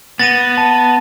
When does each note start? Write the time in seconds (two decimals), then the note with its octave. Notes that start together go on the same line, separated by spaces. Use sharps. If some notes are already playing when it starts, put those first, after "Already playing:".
0.19 B3 A6 A#6 D#7
0.58 A5